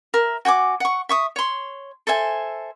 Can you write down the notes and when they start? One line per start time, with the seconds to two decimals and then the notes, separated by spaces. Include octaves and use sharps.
0.14 A#4 E5
0.45 F#4 G5 G#5 D6
0.80 F#5 C#6
1.09 E5 C#6 D#6
1.36 C#5 C6
2.07 A4 C5 E5 G#5